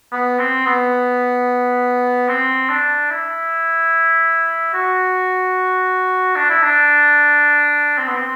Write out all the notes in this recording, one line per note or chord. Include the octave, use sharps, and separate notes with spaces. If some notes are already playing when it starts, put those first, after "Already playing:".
B3
C4
B3
C4
D4
E4
F#4
D4
E4
D4
C4
B3
C4